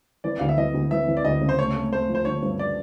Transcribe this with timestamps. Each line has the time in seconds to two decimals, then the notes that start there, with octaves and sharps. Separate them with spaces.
0.24 E3 D5
0.39 D2 F5
0.49 E5
0.57 E3 D#5
0.74 D2
0.91 E3 E5
1.08 E3
1.17 D5
1.25 D2 D#5
1.41 C#3
1.49 C5
1.58 A3 C#5
1.75 A3
1.92 A3 C5
2.09 F3
2.15 C5
2.25 D3 C#5
2.42 G2
2.59 D5